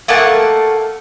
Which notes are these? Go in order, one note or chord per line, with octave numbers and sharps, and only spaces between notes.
A3 A#3 F#5 A5